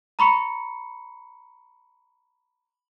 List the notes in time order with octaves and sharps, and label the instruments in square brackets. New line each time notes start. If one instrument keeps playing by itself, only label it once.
[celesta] A#5 B5 C#6 C#7